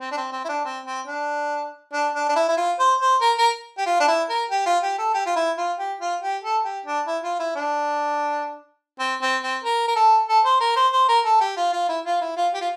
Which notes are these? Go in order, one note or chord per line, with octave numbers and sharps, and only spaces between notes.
C4
D4
C4
C4
E4
D4
C4
C4
D4
D4
D4
D4
E4
E4
F4
C5
C5
A#4
A#4
G4
F4
D4
E4
A#4
G4
F4
G4
A4
G4
F4
E4
F4
G4
F4
G4
A4
G4
D4
E4
F4
E4
D4
C4
C4
C4
A#4
A#4
A4
A4
C5
A#4
C5
C5
A#4
A4
G4
F4
F4
E4
F4
E4
F4
G4
F4